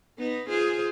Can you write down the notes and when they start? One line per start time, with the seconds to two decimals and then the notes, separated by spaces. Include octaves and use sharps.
0.18 B3 D#4 B4
0.49 F4 G#4 C5